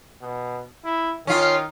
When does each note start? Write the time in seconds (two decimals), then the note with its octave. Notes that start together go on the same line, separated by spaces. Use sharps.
0.21 B2
0.85 E4
1.27 D#3 C#4 F4